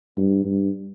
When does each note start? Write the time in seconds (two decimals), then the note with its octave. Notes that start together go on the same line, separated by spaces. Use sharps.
0.17 G2
0.44 G2